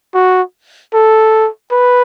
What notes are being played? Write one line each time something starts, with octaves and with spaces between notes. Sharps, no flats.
F#4
A4
B4